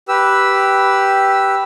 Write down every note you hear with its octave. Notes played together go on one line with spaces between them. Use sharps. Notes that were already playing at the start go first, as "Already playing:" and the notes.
G4 B4 E6